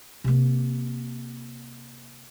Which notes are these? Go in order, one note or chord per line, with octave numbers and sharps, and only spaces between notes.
C3 A#3